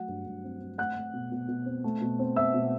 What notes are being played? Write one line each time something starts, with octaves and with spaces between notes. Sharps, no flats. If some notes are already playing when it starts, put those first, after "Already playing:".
Already playing: F#3 A3 F#5
G2
G2
C4
C4
A3 F#5 F#6
A3
B2
B2
B2
C4
A3
B2
C4
C4 E5 E6
B2